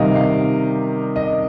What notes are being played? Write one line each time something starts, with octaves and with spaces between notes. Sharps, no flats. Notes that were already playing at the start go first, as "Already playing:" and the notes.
Already playing: C3 D#3 G3 A#4 D#5 F5
F5
D#5